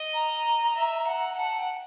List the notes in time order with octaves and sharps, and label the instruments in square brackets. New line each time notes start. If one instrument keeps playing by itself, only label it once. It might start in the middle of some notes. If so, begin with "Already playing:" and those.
Already playing: [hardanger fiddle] D#5
[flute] A#5
[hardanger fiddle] E5
F#5
[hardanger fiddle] F#5 [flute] A5
[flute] G5